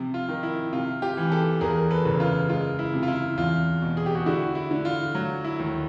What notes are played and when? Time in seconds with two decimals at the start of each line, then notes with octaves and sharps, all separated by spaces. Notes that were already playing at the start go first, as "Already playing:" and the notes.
Already playing: C3 F3
0.14 F4
0.28 D#3
0.43 E4
0.72 C3 F4
1.02 F4 G4
1.17 E3
1.31 G4 A4
1.61 E2 G#4 A#4
1.91 A4 B4
2.05 F#1
2.20 F4
2.49 G#3 F4
2.79 E4
2.94 C3
3.03 F4
3.08 E4
3.38 E2 F4
3.82 B2
3.97 G#4
4.06 G4
4.15 F#4 G#4
4.26 D3 E4 F#4
4.55 E4
4.71 D3
4.85 F4
5.15 F#3
5.44 E4
5.59 D#2